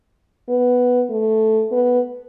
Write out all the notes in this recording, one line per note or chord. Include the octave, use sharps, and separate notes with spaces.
B3
A3
B3